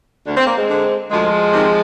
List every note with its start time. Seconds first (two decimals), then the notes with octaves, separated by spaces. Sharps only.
0.26 D2 D4
0.37 C4
0.47 A#3
0.57 G#3 C4
0.69 D3
1.11 D2 F3 G#3
1.52 C3 D#3